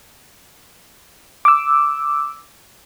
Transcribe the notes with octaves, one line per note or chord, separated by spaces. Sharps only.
D6 E6